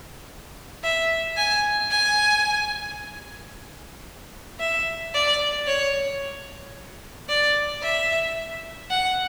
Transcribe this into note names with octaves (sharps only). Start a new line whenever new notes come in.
E5
G#5
G#5
E5
D5
C#5
D5
E5
F#5